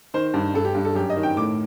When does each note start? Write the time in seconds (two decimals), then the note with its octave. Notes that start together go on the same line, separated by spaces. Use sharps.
0.14 D#3 C5
0.34 G2
0.54 G2 A4
0.65 G4
0.75 G2
0.85 A4
0.95 F#2 G4
1.10 D#5
1.16 D#3
1.23 G5
1.37 A2 D6